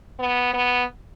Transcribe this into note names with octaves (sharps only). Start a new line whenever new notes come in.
B3
B3